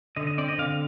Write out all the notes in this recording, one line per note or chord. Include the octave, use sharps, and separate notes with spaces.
D3 D#5
D#5
C4 D5
D#5
D3 F5